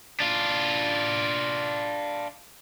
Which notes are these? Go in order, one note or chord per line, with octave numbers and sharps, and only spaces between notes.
D4 F4